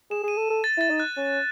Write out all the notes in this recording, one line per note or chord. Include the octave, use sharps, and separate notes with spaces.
G#4 E7
G#4 D#7
A4
A4
A6
E4 A6
D#4
F#6
C#4